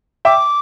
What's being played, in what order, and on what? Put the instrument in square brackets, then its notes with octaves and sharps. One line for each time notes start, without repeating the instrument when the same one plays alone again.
[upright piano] E5 G5 [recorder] D6